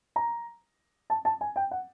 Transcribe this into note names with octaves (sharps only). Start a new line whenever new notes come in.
A#5
A5
A5
G#5
G5
F#5